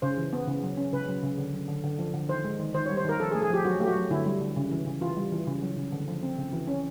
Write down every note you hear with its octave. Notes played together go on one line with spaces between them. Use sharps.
C#3 C5
E3
B3
C#3
F#3
C#4
C#3 B4
F#3
C#3
D3
F#3
D3
D3
F3
D3
D#3 C5
G#3
D#3
D#3 C5
C#5
G3
C5
D#3 A#4
F3 A4
G#4
A3
G#4
F3 G4
F#3 F#4
A3 G4
F#4
F#3
D3 E4
G3
D3
C#3
E3
C#3
E3 F4
G3
E3
C#3
F#3
C#3
D3
F3
C4
C#3
E3
C#4